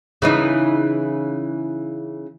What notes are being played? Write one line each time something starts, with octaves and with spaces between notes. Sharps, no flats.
C#3 E3 D#4